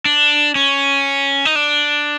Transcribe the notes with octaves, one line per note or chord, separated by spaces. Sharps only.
D4
C#4
D#4
D4